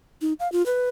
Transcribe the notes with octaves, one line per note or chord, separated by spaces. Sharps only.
D#4
F5
F4
B4